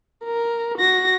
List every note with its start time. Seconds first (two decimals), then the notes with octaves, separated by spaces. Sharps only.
0.25 A#4
0.78 F#4 A#6